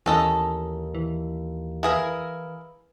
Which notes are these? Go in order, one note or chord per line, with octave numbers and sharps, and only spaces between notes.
D#2 E3 C#4 A4 D#5
E3
E4 G#4 A#4 B4 F5